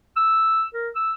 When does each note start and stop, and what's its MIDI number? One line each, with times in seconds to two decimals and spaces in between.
0.17 0.65 88
0.74 0.88 70
0.95 1.13 88